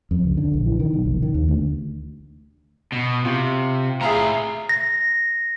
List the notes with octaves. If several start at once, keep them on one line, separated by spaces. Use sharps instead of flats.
F2
C#2
D3
A#1
E3
D#3
B1
F1
D#3
D#2
D2
B2
C3 F4
A2 G#4 E5 F5 A#5
A#6